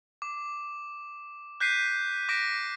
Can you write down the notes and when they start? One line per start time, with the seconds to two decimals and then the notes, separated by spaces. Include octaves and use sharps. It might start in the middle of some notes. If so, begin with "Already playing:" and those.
0.22 D6
1.60 F#6 G6 B6 C7 D#7
2.29 D6 A#6 B6 D7